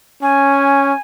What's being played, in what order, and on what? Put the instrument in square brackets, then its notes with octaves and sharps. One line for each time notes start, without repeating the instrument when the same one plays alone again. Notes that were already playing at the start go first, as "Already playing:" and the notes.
[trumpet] C#4 [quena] G#5